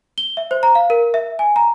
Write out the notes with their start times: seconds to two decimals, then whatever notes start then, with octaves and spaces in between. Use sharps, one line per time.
0.18 G7
0.37 E5
0.51 C5
0.63 A#5
0.75 F5
0.90 A#4
1.14 E5
1.39 G#5
1.56 A#5